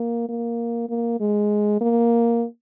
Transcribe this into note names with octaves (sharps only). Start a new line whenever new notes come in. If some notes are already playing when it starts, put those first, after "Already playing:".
Already playing: A#3
A#3
A#3
G#3
A#3